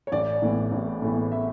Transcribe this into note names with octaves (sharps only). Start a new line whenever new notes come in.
C#5
A1 D5
A2 E3 B3
A1
A2 E3 B3
E5